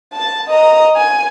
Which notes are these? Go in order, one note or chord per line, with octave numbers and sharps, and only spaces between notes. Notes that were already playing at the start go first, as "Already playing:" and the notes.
A5
D#5 A#5
G#5